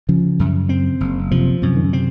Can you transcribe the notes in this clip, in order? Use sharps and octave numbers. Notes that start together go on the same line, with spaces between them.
C#3 F3
F#2
C4
F#1
C3 F3
F#2 C3
D#3
C#3
C3 C4